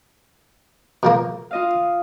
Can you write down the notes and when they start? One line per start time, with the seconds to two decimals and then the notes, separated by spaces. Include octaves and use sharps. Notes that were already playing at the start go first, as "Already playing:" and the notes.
1.03 B2 F3 A#3
1.51 F4 D#5 F5